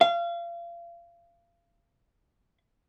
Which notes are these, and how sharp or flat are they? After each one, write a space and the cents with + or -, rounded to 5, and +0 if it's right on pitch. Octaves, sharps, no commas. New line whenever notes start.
F5 -30